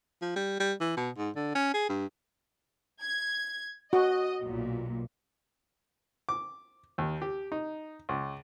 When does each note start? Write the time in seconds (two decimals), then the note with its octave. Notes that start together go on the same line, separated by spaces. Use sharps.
0.22 F3
0.36 G3
0.60 G3
0.81 E3
0.97 B2
1.17 G#2
1.36 D3
1.55 C#4
1.74 G#4
1.89 G2
3.01 G#6
3.93 F#4 D#5
4.41 B1 A#2
6.29 D6
6.98 D#2
7.22 G4
7.52 D#4
8.09 C#2